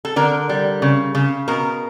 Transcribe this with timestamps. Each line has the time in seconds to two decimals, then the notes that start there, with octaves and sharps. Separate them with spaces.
0.05 A4
0.16 D3 A#4
0.49 G3
0.82 C#3
1.15 C#3
1.48 B2 A#4